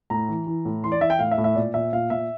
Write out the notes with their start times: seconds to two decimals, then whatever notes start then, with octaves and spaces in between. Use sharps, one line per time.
0.10 A2 A#5
0.29 E3
0.47 E3
0.65 A2
0.84 E3 C6
0.92 D5
1.01 E3 E5
1.10 G5
1.19 A2 F5
1.31 E5
1.38 A2
1.44 E5
1.55 A#2 D5
1.74 A#2 E5
1.92 A#2 F5
2.10 A#2 E5